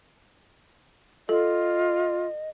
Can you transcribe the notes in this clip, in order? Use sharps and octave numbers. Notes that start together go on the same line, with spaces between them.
F4 A4 D#5